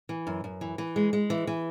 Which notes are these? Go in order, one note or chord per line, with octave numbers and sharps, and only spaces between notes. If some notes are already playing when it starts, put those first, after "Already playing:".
E3
F#2
F#2
E3
E3
G#3
G#3
E3
E3